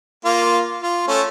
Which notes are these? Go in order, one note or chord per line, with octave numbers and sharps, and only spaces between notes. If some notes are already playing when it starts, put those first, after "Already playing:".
A#3 F4
F4
A3 C#4